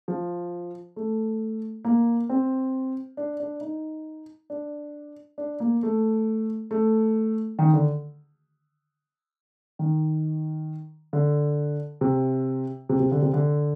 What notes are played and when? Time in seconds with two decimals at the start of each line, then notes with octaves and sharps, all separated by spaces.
0.08 F3
0.96 A3
1.85 A#3
2.29 C4
3.17 D4
3.40 D4
3.61 D#4
4.50 D4
5.38 D4
5.60 A#3
5.83 A3
6.71 A3
7.59 D#3
7.73 D3
9.79 D#3
11.13 D3
12.01 C3
12.89 C3
13.00 C3
13.12 D3
13.22 C3
13.34 D3